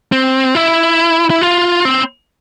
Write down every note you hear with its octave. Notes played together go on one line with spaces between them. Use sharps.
C4
E4
E4
F4
C4